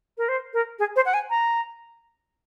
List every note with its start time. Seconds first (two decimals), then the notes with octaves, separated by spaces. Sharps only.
0.17 A#4
0.28 C5
0.53 A#4
0.79 G#4
0.96 C5
1.05 F#5
1.13 G#5
1.30 A#5